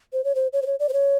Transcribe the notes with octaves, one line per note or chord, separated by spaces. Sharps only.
C5
C#5
C5
C#5
C5
C#5
D5
C5
C#5